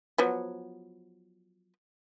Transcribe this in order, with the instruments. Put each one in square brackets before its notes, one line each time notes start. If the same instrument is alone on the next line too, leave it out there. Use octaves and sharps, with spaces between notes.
[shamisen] F3 F#3 B3